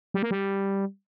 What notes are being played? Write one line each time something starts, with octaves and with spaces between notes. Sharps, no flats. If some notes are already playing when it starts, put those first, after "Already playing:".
G3
A#3
G3